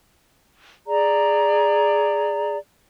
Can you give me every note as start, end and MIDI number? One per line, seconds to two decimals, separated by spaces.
0.87 2.57 68
0.87 2.57 74
0.87 2.57 82